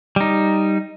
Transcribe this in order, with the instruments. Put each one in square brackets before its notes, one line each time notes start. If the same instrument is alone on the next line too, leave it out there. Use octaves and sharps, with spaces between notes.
[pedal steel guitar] G3 D#4